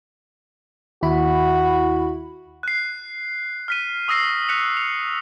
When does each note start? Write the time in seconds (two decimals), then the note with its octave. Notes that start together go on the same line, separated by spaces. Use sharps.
1.03 D#2 E4 F#4 B5
2.63 F#6 C7
3.68 F6 B6 D#7
4.08 C#6 D#6 E6 A#6 C7 D#7
4.49 F#6 B6 C#7 F7
4.77 F7